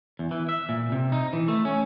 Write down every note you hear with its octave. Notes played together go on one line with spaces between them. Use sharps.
E2
E3
E5
A#2
C3
D#4
E3
A3
C#4